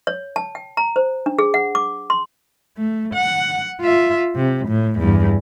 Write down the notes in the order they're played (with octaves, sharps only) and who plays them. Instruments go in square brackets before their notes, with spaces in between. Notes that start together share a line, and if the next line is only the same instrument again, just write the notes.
[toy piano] C#5
A5
G5
A#5
C5
D4
G#4
F#5
D6
C6
[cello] A3
F#5
F4 E5
C3
A2
E2 G2